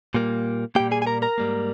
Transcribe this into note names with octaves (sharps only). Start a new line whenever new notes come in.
A#2 G3 A#3
A#2 G3 A#3 G4 G5
G#4 G#5
G#5
A#4 A#5
A#4 A#5
G#2 G3 A#3